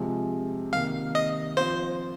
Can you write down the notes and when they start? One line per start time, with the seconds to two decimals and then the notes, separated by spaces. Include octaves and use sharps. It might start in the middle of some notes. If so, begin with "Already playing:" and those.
Already playing: C3 F3 G#3
0.72 C3 D#3 A#3 F5
1.15 D#5
1.57 F3 C4 F4 C5